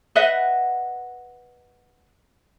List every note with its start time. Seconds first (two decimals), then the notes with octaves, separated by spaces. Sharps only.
0.15 B4 D#5 E5 F#5